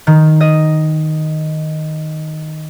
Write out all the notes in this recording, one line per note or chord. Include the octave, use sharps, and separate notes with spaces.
D#3
D#5